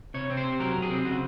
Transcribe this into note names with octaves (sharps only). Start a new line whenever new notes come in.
C3 C#5
C4
C5
C3
F#3 A#4
C3
G#4
C4
C#3 F#4